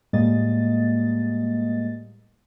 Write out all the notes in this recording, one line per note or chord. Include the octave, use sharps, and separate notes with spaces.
A2 G3 G#3 A#3 D#5 A6